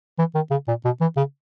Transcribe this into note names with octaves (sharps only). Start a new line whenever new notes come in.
E3
D#3
C#3
A#2
B2
E3
C#3